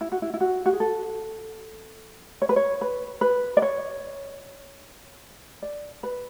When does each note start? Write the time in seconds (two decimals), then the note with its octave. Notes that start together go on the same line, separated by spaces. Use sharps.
0.01 E4
0.12 F#4
0.22 E4
0.34 E4
0.41 F#4
0.66 F#4
0.73 G#4
0.80 A4
2.42 C#5
2.49 B4
2.56 C#5
2.81 B4
3.21 B4
3.57 D5
3.62 C#5
5.62 D5
6.03 B4